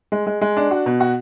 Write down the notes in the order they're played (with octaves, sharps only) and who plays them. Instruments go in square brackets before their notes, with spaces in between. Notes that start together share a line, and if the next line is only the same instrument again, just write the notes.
[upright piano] G#3
G#3
G#3
D4
F#4
B2
F#4